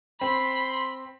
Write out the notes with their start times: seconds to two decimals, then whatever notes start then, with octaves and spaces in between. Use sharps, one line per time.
0.21 C4 B5 C6